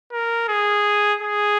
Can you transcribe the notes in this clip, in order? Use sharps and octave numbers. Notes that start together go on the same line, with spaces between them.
A#4
G#4
G#4